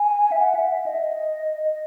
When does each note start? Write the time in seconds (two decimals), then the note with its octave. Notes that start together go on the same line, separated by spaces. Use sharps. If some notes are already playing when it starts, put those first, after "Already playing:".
Already playing: G#5
0.32 E5
0.39 F#5
0.55 E5
0.71 E5
0.86 D#5
1.65 D#5